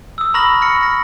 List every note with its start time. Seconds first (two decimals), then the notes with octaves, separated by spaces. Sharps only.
0.18 D#6 E6
0.34 A#5 B5 C#6 F6 A#6 F#7
0.61 F6 A#6 C#7
0.83 A#6